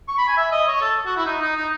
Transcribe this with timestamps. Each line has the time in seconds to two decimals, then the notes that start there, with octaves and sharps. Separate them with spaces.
0.08 C#6
0.18 B5
0.28 G#5
0.37 E5
0.52 D#5
0.67 C#5
0.82 A4
1.06 F#4
1.17 E4
1.26 D#4
1.42 D#4
1.56 D#4